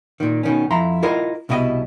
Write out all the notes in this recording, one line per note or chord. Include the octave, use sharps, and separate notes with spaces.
A#2 D#3
B2 D#3 C#4
F2 E4 A#5 C6
E4 F4 A#4 D#5
C2 B2 E4 F#4 D#5